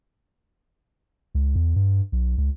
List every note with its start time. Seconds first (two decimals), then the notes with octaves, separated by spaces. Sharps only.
1.35 C#2
1.56 E2
1.76 G2
2.12 B1
2.38 C#2